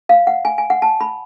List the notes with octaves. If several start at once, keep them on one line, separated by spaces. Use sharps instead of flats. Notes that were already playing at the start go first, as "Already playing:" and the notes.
F5
F#5
G#5
G#5
F#5
A5
B5